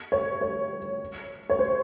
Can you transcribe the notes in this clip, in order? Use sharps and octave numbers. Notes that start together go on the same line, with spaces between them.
C#5
C#5
C#5
C5